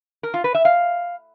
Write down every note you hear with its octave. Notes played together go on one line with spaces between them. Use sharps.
A#4
F4
B4
E5
F5